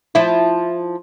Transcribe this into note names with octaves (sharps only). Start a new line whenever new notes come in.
F3 E4